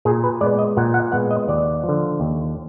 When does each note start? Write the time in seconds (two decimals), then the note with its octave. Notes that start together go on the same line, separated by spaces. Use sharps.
0.05 A#2 G#4
0.24 B4
0.41 G#3 B3 D5
0.59 D#5
0.77 A#2 F#5
0.94 F#5
1.12 G#3 B3 F#5
1.31 D#5
1.48 D#2 D5
1.84 F3
1.89 D3
2.20 D#2